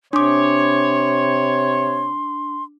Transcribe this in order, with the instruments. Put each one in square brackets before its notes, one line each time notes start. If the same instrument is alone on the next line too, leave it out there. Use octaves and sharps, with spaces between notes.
[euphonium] C3 [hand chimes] D4 D6 [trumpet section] C#5 [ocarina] C6